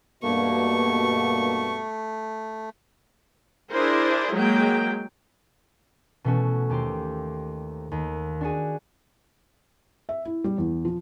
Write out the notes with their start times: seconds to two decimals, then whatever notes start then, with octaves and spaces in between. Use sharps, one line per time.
0.23 G2 B2 A3 A#3 C#6
3.72 D4 E4 G#4 A#4 C5
4.33 F#3 G#3 A#3 G5
6.24 B2 E3 A3 C#4 F#4
6.69 D#2 G4 C5 C6
7.91 D#2
8.41 D4 F#4 G#4
10.09 E5
10.25 E4
10.44 G3
10.58 E2
10.85 F3